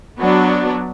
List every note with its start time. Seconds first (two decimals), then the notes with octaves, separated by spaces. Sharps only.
0.19 F#3 B3 D4